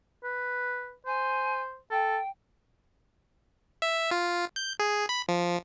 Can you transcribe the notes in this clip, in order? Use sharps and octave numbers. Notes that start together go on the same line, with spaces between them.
B4
C5 G#5
A4 G5
E5
F4
G6
G#4
B5
F3